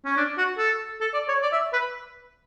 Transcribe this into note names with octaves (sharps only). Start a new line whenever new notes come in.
C#4
D4
F#4
A4
A4
D5
C#5
D5
E5
B4